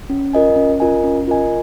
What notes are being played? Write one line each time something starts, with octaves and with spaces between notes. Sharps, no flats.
C#4
F4 A#4 D#5 G#5
C#4
F4 A#4 D#5 G#5
C#4
F4 A#4 D#5 G#5